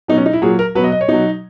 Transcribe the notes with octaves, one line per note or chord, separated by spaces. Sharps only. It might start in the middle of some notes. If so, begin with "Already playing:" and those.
B2 F#3 D#4
C#4
D#4
E4
A#2 F#3 G#4
A#4
B2 F#3 B4 D#5
D#5
C#5
B2 F#3 D#4